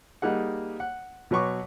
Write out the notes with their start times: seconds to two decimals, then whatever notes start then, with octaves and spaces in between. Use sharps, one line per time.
0.22 G3 A#3 D#4 G#4 F#5
0.80 F#5
1.31 B2 F#3 B4 C#6 D6